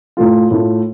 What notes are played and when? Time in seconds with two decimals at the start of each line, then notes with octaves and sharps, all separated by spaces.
0.17 A2 A3 F4
0.51 A2 A3 F4